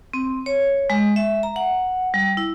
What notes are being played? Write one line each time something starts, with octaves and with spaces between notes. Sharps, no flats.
C4
C#5
G#3
E5
A#5
F#5
G3
E4